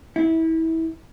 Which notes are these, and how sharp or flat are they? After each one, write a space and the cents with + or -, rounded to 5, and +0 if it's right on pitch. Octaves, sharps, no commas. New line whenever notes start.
E4 -25